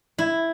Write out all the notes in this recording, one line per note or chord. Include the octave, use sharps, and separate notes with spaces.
E4